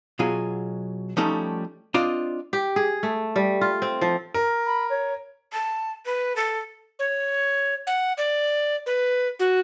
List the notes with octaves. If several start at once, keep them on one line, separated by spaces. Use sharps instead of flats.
B2 F#3 F4 G#4
F3 G3 A3 C#4 D#4 A4
C4 D4 F4 D5 D#5
G4
G#4
A3
G3
F4
C4
F3
A#4
B5
C#5
A5
B4
A4
C#5
F#5
D5
B4
F#4